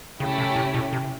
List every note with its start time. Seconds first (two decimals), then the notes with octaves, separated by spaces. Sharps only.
0.20 C#3 A3 C#4 E4 G4
0.38 C3
0.56 C3
0.74 B2
0.93 C3